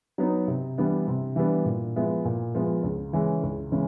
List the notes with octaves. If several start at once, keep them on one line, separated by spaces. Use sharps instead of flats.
F#3 B3 D#4
C3
E3 G3 B3 D4
C3
E3 G3 B3 D4
A#2
F3 G#3 B3 E4
A#2
F3 G#3 B3 E4
C#2
C#3 E3 G#3 C#4
C#2
C#3 E3 G#3 C#4